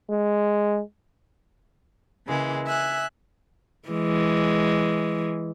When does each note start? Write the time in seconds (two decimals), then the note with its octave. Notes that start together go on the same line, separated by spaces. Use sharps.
0.10 G#3
2.26 C#3 E3 G#3 A#3
2.67 E5 G#5 F#6
3.89 E3 G#3